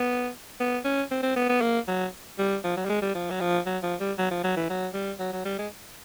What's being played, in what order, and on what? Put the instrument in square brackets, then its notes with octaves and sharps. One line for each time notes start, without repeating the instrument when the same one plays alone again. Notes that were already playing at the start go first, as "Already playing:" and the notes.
Already playing: [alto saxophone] B3
B3
C#4
C4
C4
B3
B3
A#3
F#3
G3
F3
F#3
G3
G#3
G3
F3
F#3
F3
F#3
F3
G3
F#3
F3
F#3
E3
F#3
G3
F#3
F#3
G3
G#3